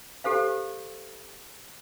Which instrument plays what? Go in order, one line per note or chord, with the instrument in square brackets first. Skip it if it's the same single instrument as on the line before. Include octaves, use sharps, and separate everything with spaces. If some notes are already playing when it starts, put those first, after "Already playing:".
[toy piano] G4 A4 C5 F5